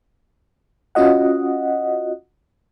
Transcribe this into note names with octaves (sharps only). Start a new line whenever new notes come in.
C#4 F4 F#4 D#5 F#5